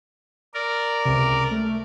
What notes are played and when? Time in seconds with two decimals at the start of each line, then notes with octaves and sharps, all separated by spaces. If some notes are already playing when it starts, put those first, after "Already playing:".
0.54 A#4 D5
1.05 C#2 C3
1.51 A3